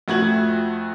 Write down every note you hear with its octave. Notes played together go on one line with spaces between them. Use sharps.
F2 A3 F#4 G#6 F#7